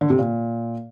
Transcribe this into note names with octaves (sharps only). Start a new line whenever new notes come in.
D3
C3
A#2